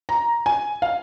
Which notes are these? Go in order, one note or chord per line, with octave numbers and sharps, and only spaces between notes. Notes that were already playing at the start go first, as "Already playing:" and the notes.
A#5
G#5
F5